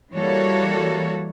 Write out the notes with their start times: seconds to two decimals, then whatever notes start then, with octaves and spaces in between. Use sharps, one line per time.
0.14 E3 G3 A#3 F#4 A4 C#5